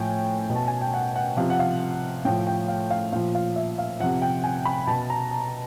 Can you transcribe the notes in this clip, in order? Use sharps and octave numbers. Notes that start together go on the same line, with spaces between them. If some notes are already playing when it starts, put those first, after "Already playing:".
Already playing: A2 F3 G5 G#5
B2
A5
G#5
G5
F#5
F#5
C3 F3 F5
F#5
F5
A2 F3 G5
G5
F5
F5
A#2 F3 F5
F5
E5
F5
C3 F3 F#5
G5
G#5
B5
B2 A5
A#5
A5